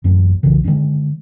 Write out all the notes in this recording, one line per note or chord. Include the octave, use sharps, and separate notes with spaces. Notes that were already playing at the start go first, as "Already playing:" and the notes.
A1 F#2 A2 F#3
B1 C#3 E3
D3 D#3 G3 G#3